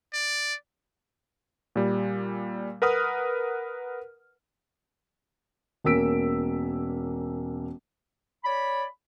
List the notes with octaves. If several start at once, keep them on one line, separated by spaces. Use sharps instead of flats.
D5
A#2 G3
A#4 B4 F#5 D#6 F6
E1 A#3 C#4 E6 B6 D7
C#5 D5 B5